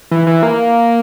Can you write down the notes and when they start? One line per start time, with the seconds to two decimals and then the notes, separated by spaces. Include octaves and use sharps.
0.11 E3
0.27 E3
0.43 A#3